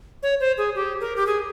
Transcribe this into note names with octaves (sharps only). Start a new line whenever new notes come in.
C#5
C5
G#4
G4
A#4
G4
G#4